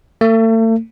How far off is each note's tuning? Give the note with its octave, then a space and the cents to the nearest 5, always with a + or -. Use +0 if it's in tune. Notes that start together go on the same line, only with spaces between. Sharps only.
A3 +40